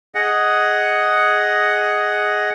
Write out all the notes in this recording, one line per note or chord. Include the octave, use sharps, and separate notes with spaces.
G#4 D#5 F#5